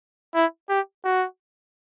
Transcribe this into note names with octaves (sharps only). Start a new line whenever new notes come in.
E4
G4
F#4